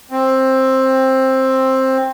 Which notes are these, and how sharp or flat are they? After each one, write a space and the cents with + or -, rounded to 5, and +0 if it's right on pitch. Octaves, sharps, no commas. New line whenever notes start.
C4 +10